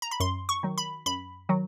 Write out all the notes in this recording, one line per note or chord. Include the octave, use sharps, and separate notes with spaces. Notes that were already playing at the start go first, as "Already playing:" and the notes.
A#5
B5
F#2 C6
C#6
D#3 F#3
B5
F#2 B5
D#3 F#3